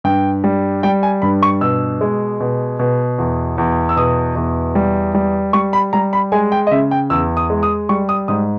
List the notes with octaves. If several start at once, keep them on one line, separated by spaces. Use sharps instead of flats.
G2 G5
G3
G3 G5
G#5
G2 B5
C#6
B2 E6
G#3
B2
B2
E2
E2
E6
B2 D#6
E2
G3
G3
G3 C#6
B5
G3 A#5
B5
G#3 G#5
G5
D#5
C#3 E5
G5
E2 E6
D#6
G#3
D#6
G3 C#6
D#6
G#2 D#6